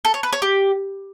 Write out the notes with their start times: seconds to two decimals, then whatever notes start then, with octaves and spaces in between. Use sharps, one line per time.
0.05 A4
0.14 C#5
0.23 B4
0.33 C#5
0.42 G4